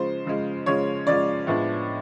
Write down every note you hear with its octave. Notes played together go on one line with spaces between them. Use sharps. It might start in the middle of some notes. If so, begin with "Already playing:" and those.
Already playing: C#3 F3 G#3 C5
C#3 F3 G#3
C#3 F3 G#3 C#5
C#3 F3 G#3 D5
A2 F3 G#3 B3 D4